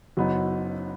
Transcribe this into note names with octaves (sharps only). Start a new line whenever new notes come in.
F#1 F#2 F#3 B3 D#4